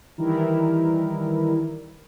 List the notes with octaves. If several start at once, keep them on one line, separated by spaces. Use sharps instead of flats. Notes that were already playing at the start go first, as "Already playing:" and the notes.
D#3 E3 G3 E4 A#4